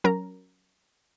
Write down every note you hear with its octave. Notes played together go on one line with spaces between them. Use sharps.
F#3 C#4 A#4 A#5